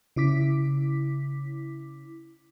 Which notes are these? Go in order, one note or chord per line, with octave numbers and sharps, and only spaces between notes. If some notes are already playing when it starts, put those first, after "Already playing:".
C#3 E4 D6 B6